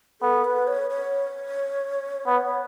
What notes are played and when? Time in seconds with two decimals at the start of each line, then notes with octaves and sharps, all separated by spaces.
0.21 B3 A4
0.44 B4
0.67 C#5
0.90 C#5
2.27 B3